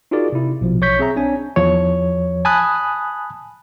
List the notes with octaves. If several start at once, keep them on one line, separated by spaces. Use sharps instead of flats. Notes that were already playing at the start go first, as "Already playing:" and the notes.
D#4 F4 F#4 G#4 A#4 D5
C3 E4
A#1 B2 F3
B1 C#5 C#6 G6 B6
C4 G#4 E5 A#5
C4 D4 C#5 G#5
E2 F3 C#5
G#5 A5 B5 D#6 F#6